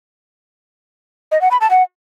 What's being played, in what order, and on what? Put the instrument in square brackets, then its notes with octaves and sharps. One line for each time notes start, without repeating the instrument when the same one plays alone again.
[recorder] D#5
F#5
B5
A5
F#5